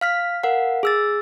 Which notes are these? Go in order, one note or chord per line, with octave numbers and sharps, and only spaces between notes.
F5 F6 B6
A#4 F5 F#5
G#4 E6 A6